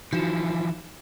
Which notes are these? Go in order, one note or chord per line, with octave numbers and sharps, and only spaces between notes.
E3 F3 D#4 F#4 E7